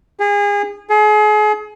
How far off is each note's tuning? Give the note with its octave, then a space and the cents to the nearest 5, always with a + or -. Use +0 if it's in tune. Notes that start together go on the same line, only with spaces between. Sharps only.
G#4 -30
G#4 +35